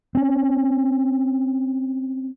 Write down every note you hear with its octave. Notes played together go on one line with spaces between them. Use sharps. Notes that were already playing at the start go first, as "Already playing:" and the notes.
C4 C#4